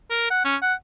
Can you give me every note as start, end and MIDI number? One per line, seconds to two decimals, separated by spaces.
0.10 0.30 70
0.30 0.41 78
0.45 0.56 61
0.62 0.74 78